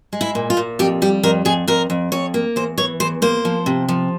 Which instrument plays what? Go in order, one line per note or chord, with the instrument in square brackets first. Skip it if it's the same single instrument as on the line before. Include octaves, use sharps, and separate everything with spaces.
[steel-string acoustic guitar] G#3
E4
A#2
F4
A#2
F2 G4
G3 G4
F2 A#4
F2 G#4
F2 A#4
F2
F2 C#5
A#3
E2 C5
E3 C#5
E2 C5
A#3 C5
F3
C3
F3